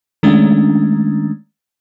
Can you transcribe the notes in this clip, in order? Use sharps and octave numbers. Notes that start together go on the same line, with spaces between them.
D#3 G#3 A3 C#4 D4